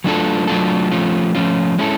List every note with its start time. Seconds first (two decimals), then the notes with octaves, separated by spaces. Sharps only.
0.04 F#3 A3 D4 F4 A4
0.47 F#3 A3 D4 F4 A4
0.91 F3 A3 C#4 F4
1.35 F3 A3 C#4 F4
1.79 G#3 C#4 E4 A4